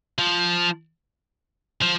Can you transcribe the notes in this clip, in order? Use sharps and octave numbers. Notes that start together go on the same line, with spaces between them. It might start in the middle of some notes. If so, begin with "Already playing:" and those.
F3
F3